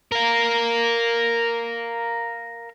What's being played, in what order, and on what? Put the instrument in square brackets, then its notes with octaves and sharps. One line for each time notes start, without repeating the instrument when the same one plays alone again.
[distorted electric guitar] A#4 F5